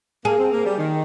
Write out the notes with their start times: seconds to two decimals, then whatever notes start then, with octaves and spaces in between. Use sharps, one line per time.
0.25 A#3 G#4
0.38 C4
0.51 A#3
0.64 G3
0.77 D#3